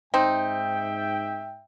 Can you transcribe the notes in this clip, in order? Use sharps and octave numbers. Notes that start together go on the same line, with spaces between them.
G#2 C4 D#4 E5 G5